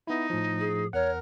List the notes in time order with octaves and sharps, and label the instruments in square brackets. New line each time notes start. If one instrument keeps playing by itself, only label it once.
[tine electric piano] B3 E4 [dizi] D#4
[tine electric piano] A2 F3
[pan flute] G#4
[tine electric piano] E2 F#5 [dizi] A#4 [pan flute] C#5